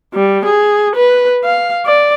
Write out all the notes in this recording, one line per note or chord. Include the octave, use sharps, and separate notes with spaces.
G3
G#4
B4
F5
D5